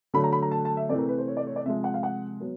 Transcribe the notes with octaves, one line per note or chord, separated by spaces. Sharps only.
D3 F#3 A3 B5
A#5
B5
A#5
A5
A5
E5
C3 E3 A3 C4 D5
A#4
B4
C5
C#5
D5
C#5
D5
C3 F3 G#3 E5
F#5
F5
F#5
F#3 B3